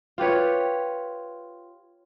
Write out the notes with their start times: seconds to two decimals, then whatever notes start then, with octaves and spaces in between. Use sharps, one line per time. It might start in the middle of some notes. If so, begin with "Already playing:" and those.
0.18 F4 G4 B4 C#5